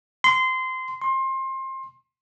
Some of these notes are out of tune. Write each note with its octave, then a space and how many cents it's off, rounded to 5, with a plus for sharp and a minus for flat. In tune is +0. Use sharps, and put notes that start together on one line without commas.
C6 -20
C6 +25